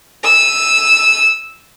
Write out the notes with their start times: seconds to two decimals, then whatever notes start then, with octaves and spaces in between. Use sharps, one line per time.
0.24 E6 D#7